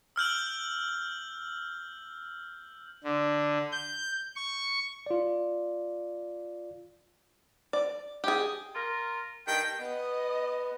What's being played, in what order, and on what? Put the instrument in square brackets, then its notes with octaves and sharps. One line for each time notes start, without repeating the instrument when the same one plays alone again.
[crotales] E6 F6 G6 F#7
[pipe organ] D3
G6
C#6
[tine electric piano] F4 D5
[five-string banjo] D5
G4 G#4
[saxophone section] F4 A#4
[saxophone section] G2 D#3 [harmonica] G5
[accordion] B3 [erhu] D#5